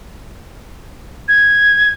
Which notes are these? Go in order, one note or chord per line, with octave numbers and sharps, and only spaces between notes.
G#6